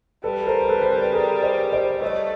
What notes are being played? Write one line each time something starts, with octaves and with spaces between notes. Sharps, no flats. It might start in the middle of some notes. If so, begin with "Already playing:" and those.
G3 A4 B4
A#4 C5
C5
A4 B4
C5
A4 B4
B4
G#4 A#4
C5 D5
C5 D5
A3 C#5 D#5